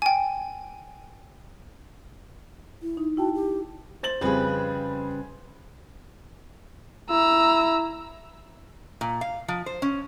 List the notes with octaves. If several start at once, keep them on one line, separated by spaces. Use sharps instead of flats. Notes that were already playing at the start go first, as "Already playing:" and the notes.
G5 G#5
E4
D#4
E4 F#4 G5 A5
G4
C5 A6 F#7
F2 C#3 G3 G#4 B4 C5
E4 A#5 E6
A#2
F5
F3
C5
C#4